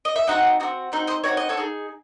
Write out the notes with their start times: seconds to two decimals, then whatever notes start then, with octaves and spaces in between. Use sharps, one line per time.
0.05 D#5
0.16 E5
0.27 C4 D#4 F#4 D#5 F#5
0.60 C4 D#4 F#4
0.92 C4 D#4 F#4
1.07 C5 D#5
1.24 C4 D#4 F#4 C#5
1.37 D#5
1.49 A4 C#5
1.57 D#4 G#4